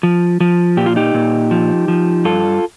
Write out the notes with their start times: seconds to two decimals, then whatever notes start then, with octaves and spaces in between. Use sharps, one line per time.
0.03 F3
0.40 F3
0.77 A#2 G4
0.86 F4
0.96 D#4 G4
1.14 A#2
1.51 F3
1.88 F3
2.25 G2 F4 A4